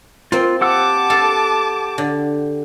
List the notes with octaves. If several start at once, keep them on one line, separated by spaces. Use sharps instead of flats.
A#3 C4 F4
G4 F#5 A5 D6 E6
A4 F5
D3